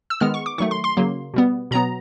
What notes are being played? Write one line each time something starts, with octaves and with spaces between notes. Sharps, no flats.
E6
D#3 G#3 B3 F6
C#6
D6
D#3 F#3 A3 C#6
C6
C6
C#3 F#3 A#3
B2 G3 B3
B2 F#3 B3 A#5